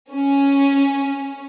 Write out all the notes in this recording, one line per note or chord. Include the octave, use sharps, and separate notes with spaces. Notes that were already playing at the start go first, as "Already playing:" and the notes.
C#4